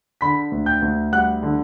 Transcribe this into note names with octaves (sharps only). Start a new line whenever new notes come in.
D3 B5 B6
D2
G5 G6
D2
G3 F#5 F#6
D3